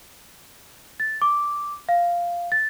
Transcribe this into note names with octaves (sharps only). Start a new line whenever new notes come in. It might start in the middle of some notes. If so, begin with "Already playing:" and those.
A6
D6
F5
A6